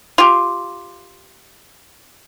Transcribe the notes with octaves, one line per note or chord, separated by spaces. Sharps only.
F4 G4